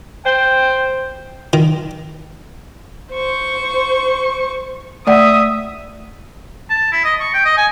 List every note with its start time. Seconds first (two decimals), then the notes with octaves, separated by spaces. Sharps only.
0.25 C5 G5
1.53 D#3
3.14 C5 C#6
5.07 A3 D5 E5 F#5 D#6
6.70 A5
6.92 E4
7.04 D#5
7.20 C#6
7.34 G5
7.45 D#5
7.58 G#5